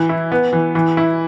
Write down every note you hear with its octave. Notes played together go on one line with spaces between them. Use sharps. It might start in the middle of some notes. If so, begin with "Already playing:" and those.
Already playing: E3
E4
B3
E3
E3
E4